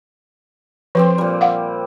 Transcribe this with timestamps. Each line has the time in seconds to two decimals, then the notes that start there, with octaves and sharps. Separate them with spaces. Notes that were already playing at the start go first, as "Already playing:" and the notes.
0.95 F3 C4 G4 B4 C5
1.18 A#2 G3
1.41 F5 F#5